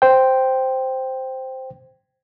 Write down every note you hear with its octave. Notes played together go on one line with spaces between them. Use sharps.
C5 G5